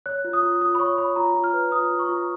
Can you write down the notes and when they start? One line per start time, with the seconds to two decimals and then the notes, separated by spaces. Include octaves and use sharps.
0.06 C#5 F#6
0.25 F4
0.33 D#6
0.43 F4
0.61 F4 D#6
0.75 B5
0.80 C#5 C#6
0.98 C#5 B5
1.16 F4 A#5
1.34 F4
1.44 F6
1.53 B4
1.71 F4 D#6
1.91 F4
1.99 C#6
2.09 F4